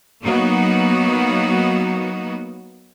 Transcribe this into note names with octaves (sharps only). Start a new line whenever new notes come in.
F#3 A#3 B3 D#4 F#4